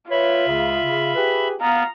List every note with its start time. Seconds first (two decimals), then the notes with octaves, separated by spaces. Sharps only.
0.11 F4 B4 C#5 E5 B5
0.48 C#2 C#3
0.84 C#3
1.15 G4 G#4 B4
1.61 B3 F5 A#5